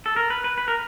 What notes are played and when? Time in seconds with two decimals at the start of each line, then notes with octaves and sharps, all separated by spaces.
0.06 A4
0.16 A#4
0.30 B4
0.44 B4
0.58 B4
0.68 A#4